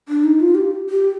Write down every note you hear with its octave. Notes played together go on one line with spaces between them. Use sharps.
D4
D#4
F4
G4
G4